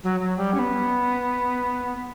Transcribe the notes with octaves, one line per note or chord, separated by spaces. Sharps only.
F#3
F#3
G3
C#4
B3